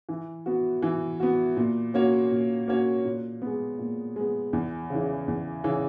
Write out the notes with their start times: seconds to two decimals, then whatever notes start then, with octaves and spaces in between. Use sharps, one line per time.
0.09 E3
0.46 B3 F#4
0.82 E3
1.20 B3 F#4
1.57 A#2
1.94 A#3 C#4 F#4 C#5
2.31 A#2
2.68 A#3 C#4 F#4 C#5
3.05 A#2
3.42 G#3 B3
3.79 A#2
4.16 G#3 B3
4.53 E2
4.90 C#3
4.95 E3
5.28 E2
5.64 C#3 E3